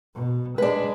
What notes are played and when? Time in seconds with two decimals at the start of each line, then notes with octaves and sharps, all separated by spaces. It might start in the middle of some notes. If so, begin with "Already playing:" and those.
0.15 B2
0.58 G#3 D4 B4